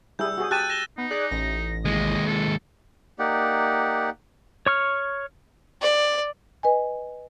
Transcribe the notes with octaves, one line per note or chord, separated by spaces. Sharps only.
G3 E4 G#4 E6 G6
F#4 G#4
G4 A5 F#6 A6 D#7
A#6 E7 G7
B3 D#4
G#4 D5 F#6
A1 A#6
D#2 G#3 D#5
A4
A#3 D#4 G4 D5 F#5
C#5 C#6 F6
D5
B4 D#5 G#5